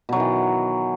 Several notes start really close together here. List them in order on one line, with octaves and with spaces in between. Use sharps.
B2 F#3 D#3 E3